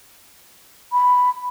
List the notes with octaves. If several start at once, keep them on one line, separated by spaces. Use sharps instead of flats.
B5